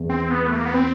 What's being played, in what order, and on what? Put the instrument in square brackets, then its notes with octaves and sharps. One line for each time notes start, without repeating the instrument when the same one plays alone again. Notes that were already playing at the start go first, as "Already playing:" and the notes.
Already playing: [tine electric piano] E2
[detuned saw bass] C4
B3
A3
A#3
B3
C4